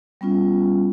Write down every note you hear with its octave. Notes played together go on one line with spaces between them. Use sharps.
G3 B3 C#4 F4